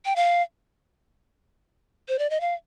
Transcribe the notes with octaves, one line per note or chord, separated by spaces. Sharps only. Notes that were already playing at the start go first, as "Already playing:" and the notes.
G5
F5
C5
D5
D#5
F5